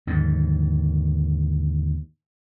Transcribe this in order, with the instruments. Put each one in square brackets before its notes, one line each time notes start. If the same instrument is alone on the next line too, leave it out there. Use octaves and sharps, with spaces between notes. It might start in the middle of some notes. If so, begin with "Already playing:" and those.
[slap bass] D#2 G#2 D3